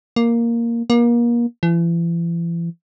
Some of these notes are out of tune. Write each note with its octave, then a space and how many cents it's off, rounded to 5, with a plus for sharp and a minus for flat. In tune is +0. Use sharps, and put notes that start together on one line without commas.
A#3 +0
A#3 +30
E3 +40